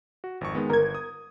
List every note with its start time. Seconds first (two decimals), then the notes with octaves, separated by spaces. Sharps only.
0.24 F#4
0.41 G#1 F2 C#6
0.55 D#3 G#3 B3
0.70 G1 A#4 G#6
0.95 D#6